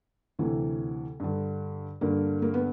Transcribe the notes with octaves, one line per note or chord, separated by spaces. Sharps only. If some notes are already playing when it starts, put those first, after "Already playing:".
D2 C3 E3
G2 D3
G2 D3 A#3
A#3
B3